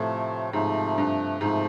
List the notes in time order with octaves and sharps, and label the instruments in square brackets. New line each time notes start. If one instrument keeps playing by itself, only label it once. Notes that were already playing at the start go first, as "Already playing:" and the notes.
Already playing: [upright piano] A2 [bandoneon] C3 F3 A3
[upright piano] G#2 [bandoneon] C3 F3 A3
[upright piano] G2
[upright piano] G#2 [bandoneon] C3 F3 A3